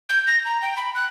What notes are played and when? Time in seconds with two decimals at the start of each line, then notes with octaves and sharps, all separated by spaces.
0.09 G6
0.27 A#6
0.45 A#5
0.62 G5
0.77 B5
0.95 F#6